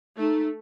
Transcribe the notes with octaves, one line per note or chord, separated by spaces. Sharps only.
A3 D#4